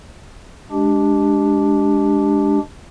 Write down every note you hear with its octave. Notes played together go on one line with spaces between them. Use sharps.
G#3 D4 G4